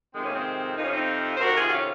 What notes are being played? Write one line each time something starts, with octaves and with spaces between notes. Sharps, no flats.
F2 C3 D#3 G#3 C4
A#3 C#4
G#3 C4
F2 C3 F3 D#4
C#4
C4 D#4
C5
F2 C3 D#3 F#4 A#4
F4 G#4
F#4
C#4 F4